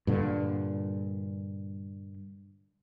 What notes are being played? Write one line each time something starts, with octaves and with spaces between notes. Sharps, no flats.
G2 A#2 D3